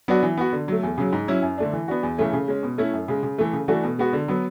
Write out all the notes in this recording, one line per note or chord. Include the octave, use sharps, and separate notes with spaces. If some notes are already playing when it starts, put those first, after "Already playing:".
F#3 B3 D4 F#4
E3
B3 F#4
D3
F#3 A3
E2
C#3 F#3
G#2
F#3 C#4 E4
F#2
D3 A3 D4
E3
B3 D4 F#4
E2
C#3 E3 A3 C#4
C#3
G#3 C#4
B2
A3 C#4 E4
F#2
C#3 G#3
C#3
E3 A3
C#3
E3 A3 D4 F#4
B2
G#3 B3 F#4
D3
F#3 B3